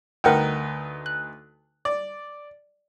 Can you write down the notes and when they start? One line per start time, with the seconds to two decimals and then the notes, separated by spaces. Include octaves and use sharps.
0.24 D2 D#4 A#4 B4 F#5 G5
1.06 F#6
1.85 D5